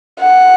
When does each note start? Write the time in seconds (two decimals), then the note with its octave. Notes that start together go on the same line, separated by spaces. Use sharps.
0.21 F#5